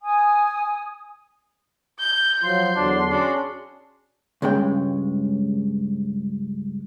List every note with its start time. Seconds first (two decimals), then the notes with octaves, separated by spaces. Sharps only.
0.02 G#5 D#6
1.99 G6 G7
2.43 F3 F#3 F4 C6
2.76 E2 D3 F#3 D4
3.11 C#4 D4 F#4 G#4
4.42 C#2 G2 C#3 G#3 G5